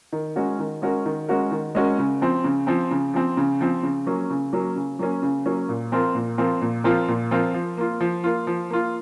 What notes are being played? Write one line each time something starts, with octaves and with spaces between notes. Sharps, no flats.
D#3
G#3 C#4 F#4 A#4
D#3
G#3 C#4 F#4 A#4
D#3
G#3 C#4 F#4 A#4
D#3
G#3 C#4 F#4 A#4
C#3
F3 C4
C#3
F3 C4
C#3
F3 C4
C#3
F3 C4
C#3
F#3 A#3 C#4
C#3
F#3 A#3 C#4
C#3
F#3 A#3 C#4
C#3
F#3 A#3 C#4
A#2
F3 C4 F4 A#4
A#2
F3 C4 F4 A#4
A#2
F3 C4 F4 A#4
A#2
F3 C4 F4 A#4
F3
A#3 F4
F3
A#3 F4
F3
A#3 F4